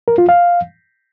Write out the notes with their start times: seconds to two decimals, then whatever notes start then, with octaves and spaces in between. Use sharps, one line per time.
0.08 A#4
0.18 F4
0.29 F5